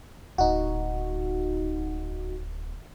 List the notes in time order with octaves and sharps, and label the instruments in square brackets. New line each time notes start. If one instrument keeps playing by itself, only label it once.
[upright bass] D1 [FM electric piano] D#4 F#4